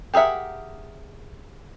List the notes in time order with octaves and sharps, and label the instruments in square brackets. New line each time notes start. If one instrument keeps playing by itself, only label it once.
[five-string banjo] G4 G#4 A#4 E5 F#5